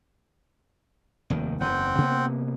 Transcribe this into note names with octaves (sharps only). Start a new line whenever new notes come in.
F1 D#2 D#3
F#1 E2 C4 F#5 G5
C3 A#3 B3